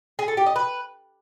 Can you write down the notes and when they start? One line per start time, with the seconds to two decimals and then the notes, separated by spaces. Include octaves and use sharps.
0.19 G#4
0.28 A4
0.37 G4
0.46 D#5
0.56 B4